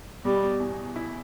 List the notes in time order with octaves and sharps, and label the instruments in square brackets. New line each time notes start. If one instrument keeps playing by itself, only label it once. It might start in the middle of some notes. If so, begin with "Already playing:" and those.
[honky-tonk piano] B2 [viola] G3
[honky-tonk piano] E2
E4